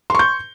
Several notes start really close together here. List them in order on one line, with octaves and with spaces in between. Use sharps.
C6 C#6 G6